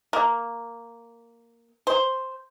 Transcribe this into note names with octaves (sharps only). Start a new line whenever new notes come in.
A#3
C5